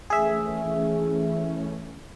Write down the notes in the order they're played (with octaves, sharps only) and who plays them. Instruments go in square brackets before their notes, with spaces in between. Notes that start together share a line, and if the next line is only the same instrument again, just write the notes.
[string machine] E3 A3 C#4 [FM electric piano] G#4 E5